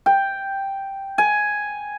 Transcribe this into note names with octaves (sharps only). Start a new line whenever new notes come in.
G5
G#5